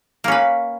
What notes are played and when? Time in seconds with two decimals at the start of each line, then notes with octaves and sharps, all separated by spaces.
0.24 A#3
0.28 C#4
0.32 B4